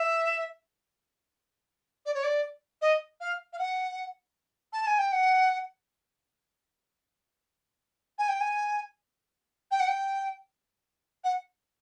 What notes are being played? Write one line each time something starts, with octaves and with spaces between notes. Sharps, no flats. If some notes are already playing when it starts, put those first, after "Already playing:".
Already playing: E5
D5
C#5
D5
D#5
F5
F5
F#5
A5
G#5
G5
F#5
G#5
G5
G#5
G5
F#5
G5
F#5